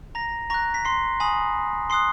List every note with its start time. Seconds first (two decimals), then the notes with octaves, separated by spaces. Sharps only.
0.15 A#5 A#6
0.50 A#5 C#6 F#6 A#6
0.74 B6
0.85 C6 C7
1.20 G#5 B5 D#6
1.90 C6 D#6 F#6 C7